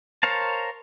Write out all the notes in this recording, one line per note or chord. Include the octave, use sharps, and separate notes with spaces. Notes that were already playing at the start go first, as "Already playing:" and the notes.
A#4 C5 C#5 F5 A5